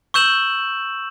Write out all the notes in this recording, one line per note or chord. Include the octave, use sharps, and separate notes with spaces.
C#6 E6 G6 E7 F#7